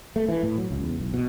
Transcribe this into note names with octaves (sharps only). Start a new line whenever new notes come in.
A3
E3
A2
F#3
C#2
E2
B1
B2